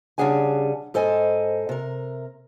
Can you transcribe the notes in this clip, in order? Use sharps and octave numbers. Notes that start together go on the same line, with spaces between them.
C#3 G3 D4 G#4 F#5 G#5
G#2 A4 C5 D#5 G#5
C3 A#4